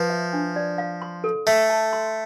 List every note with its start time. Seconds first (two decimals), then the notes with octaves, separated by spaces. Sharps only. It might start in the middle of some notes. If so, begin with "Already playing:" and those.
Already playing: F3 B4
0.10 E5
0.33 D4
0.56 D5
0.78 F5
1.02 C6
1.24 A4
1.47 A3 E5
1.70 A5
1.93 C6